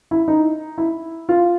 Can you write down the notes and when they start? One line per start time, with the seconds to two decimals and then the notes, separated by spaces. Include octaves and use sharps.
0.11 E4
0.28 D#4
0.78 E4
1.29 F4